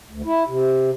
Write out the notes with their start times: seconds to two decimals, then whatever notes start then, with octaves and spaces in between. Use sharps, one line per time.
0.11 D2
0.25 E4
0.48 C3